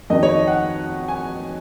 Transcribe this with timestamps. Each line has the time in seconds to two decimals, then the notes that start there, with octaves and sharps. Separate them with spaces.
0.10 F2 D#3 F#3 D#5
0.23 C#5
0.35 D#5
0.47 F#5
1.08 G#5